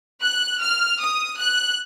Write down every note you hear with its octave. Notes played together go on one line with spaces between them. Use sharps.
F#6
F6
D#6
F#6